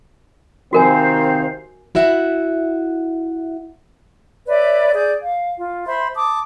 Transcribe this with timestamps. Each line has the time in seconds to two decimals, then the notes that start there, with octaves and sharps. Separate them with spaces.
0.73 C3 D#3 C4 F#4 A#4 C5 F5 G#5
1.95 E4 F#4 E5 F#5
4.47 B4 C#5 D5 E5
4.94 G#4 D5 G6
5.22 F5
5.58 F4
5.87 C5 E5 B5 C6
6.15 A5 D6 D#6